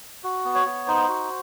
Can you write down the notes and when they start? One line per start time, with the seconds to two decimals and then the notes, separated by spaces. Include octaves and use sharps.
0.24 F#4
0.45 B3
0.55 C#5
0.66 B3
0.87 D#4 C5
1.09 F#4